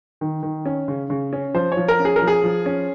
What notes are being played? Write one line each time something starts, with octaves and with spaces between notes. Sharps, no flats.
D#3
D#3
C#4
C#3
C#3
C#4
F3 C5
C#5
F3
A#4
C#4
G#4
A#4
F3
G#4
F3
C#4